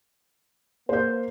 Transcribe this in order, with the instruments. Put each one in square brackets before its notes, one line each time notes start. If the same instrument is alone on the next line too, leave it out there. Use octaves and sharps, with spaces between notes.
[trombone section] A#3 [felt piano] C5 G6